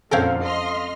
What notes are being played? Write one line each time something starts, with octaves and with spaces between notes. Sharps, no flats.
F2 A#2 D3 C4 C#4 A4 A#4 F5
D#5 C6 F6